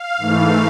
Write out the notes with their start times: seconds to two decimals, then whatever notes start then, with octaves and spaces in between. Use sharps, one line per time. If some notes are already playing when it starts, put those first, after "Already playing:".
Already playing: F5
0.17 G#2 E3 A3